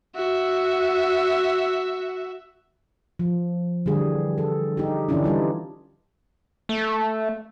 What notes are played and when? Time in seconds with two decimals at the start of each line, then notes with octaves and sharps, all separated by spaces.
0.15 F#4 E5
3.19 F3
3.86 D3 E3 G3 G#4
4.38 A4
4.77 D#4 G4
5.09 D3 E3 C#4 D4 E4
5.24 G3 D#4 F4
6.69 A3